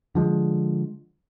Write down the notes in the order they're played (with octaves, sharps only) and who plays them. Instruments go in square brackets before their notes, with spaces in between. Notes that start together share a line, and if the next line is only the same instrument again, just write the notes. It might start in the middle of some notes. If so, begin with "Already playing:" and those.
[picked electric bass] D3 F3 G#3